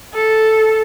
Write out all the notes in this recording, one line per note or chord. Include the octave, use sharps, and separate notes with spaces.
A4